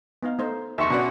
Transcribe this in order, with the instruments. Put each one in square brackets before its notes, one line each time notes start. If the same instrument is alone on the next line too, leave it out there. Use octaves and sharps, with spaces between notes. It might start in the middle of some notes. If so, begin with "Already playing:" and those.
[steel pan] B3 D#4 F5
A3 D#4 C5
[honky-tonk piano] F1 D#2 [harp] E5 C6 C#6
[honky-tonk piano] B2 F#4 D5 [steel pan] C#4 D4